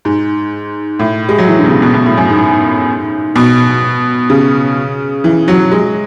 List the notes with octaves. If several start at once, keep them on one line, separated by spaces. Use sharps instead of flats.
G#2
A2
G#3
F#3
E3
D3
B2
C#3
B2
B2
A2
F#2
G#2
B2
C#3
E3
F#3
G#3